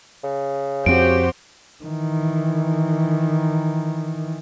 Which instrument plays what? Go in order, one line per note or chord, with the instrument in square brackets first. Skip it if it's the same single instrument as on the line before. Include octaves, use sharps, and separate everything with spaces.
[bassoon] C#3
[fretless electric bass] F2 C4 [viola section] F#4 G4 C5 [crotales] D7
[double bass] D#3 E3